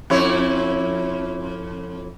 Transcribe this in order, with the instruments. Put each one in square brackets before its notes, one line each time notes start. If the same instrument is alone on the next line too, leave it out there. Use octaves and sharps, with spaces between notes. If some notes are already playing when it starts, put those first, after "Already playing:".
[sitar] F2 E4 C#5